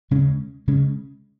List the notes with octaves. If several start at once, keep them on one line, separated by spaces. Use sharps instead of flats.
D#2 C#3 G#3 C#4
C#3 G#3 C#4